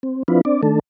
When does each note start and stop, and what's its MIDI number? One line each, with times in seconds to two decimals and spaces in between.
0.03 0.23 60
0.28 0.41 53
0.28 0.41 60
0.28 0.41 62
0.28 0.41 64
0.28 0.41 65
0.28 0.41 71
0.45 0.61 60
0.45 0.61 62
0.45 0.61 74
0.63 0.79 51
0.63 0.79 57
0.63 0.79 62
0.63 0.79 69